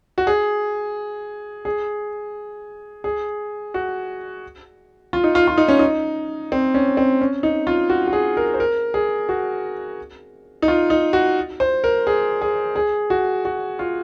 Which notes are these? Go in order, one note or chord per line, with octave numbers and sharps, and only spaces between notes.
F#4
G#4
G#4
G#4
F#4
F4
D#4
F4
F4
D#4
C#4
D#4
C4
C#4
C4
C#4
D#4
F4
F#4
F#4
G#4
A#4
C5
A#4
G#4
F#4
D#4
F4
D#4
F#4
C5
A#4
G#4
G#4
G#4
F#4
F#4
F4